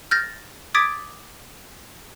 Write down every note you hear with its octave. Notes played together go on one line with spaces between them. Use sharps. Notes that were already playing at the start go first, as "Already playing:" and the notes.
F6 G6 A6 A#6
D6 D#6 G#6 A6 B6 D7